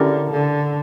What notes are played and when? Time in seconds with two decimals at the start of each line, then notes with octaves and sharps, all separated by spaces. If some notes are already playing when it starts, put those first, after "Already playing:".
Already playing: D3 C#4 E4 G4 A#4 D5
0.31 D3